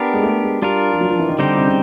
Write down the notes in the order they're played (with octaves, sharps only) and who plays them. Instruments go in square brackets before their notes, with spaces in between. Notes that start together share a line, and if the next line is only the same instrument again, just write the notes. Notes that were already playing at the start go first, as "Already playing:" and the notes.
Already playing: [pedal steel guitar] B3 D4 G4 A#4
[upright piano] G#3
A3
G#3
[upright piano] G3 [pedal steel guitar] D4 F4 A#4
[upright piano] F3
F#3
F3
E3
D#3
[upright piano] D3 [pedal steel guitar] G3 C4 D#4 G4 C5
[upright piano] C3
C#3